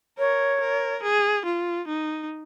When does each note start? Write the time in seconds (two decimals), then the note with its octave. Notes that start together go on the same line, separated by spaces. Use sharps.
0.18 A#4 C#5
0.61 A#4
1.03 G#4
1.45 F4
1.88 D#4